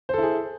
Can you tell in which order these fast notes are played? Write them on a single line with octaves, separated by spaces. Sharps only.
C5 A4 E4 G#4